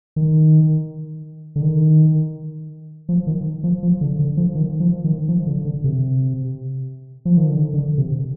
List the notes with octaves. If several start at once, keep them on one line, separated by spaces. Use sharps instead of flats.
D#3
D3
D#3
F3
D#3
F3
F3
D3
D3
F3
D#3
F3
D#3
F3
D3
D3
C3
F3
D#3
D3
D3
C3